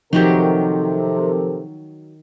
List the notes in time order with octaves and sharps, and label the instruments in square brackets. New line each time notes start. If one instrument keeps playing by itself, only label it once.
[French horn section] C3 A4 A#4 [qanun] D#3 F#3 G4 [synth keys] F3